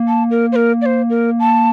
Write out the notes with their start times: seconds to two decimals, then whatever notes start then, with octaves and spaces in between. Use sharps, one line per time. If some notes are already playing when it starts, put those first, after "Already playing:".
Already playing: A#3
0.08 A5
0.31 A#4
0.52 C5
0.56 A#4
0.82 D5
0.86 C5
1.10 A#4
1.40 A5